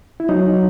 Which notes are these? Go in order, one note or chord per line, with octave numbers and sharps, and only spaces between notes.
E4
F#3 D#4